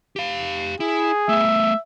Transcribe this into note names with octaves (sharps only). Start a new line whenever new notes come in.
G4 F5
E4 G#4
A3 B3 E5